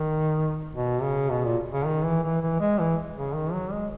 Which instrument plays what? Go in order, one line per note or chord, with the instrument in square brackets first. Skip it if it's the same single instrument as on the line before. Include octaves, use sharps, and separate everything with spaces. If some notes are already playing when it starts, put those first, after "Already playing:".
Already playing: [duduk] D#3
B2
C#3
B2
A#2
C#3
D#3
E3
E3
E3
G#3
E3
C#3
D#3
F#3
G#3